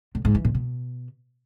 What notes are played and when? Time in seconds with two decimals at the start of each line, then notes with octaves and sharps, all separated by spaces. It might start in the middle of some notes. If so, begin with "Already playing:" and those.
0.15 A2
0.25 G#2
0.35 E3
0.45 A#2
0.55 B2